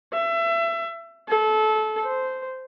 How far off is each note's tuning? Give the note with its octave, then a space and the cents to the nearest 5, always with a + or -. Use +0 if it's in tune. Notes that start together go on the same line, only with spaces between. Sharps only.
E5 +30
A4 -25
C5 -10